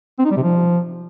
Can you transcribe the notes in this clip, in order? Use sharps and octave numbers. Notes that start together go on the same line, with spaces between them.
C4
D#4
G3
C3
F3